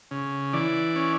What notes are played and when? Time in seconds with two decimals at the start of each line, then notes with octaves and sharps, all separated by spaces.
0.11 C#3
0.53 E3 D5
0.96 C#4